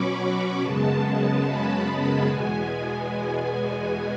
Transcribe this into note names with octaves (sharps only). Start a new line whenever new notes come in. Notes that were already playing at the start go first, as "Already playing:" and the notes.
Already playing: B2 F#3 C#4 B5 C#6 D6
B5
F#2 C#3 G#3 B3 A5
A5
B5
A5
E2 B2 G#3 B3 G#5